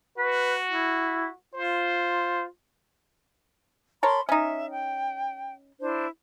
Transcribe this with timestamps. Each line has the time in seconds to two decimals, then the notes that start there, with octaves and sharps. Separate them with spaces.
0.18 F#4 B4
0.71 E4
1.54 F4 C5
4.03 A#4 C#5 A5 B5 C6
4.29 C#4 D#4 E5
4.70 G5
5.81 D4 E4 C5